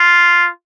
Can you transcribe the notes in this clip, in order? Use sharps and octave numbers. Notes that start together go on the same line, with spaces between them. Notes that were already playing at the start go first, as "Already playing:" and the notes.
Already playing: F4